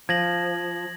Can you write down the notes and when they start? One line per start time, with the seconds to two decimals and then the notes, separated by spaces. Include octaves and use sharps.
0.09 F3 G#6 A#6 F#7